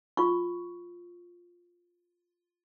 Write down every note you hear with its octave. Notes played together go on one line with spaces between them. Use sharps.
F4 C#6